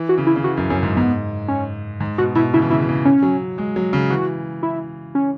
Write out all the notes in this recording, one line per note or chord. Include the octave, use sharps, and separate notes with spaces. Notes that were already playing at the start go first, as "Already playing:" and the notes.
Already playing: E3
F#4
C#3
E4
C#3
E3 F#4
F#2
F#2 C#4
G#2
G#2 B3
C#4
G#2
B2 F#4
B2 E4
C#3 E4
E3
C#3 E4
E3
C#3
C#4
F#3
G#3
F#3
C#3
E3 F#4
E4
C#4